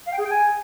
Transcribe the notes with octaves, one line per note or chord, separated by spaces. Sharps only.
F5
G5
G#4
G5
G#5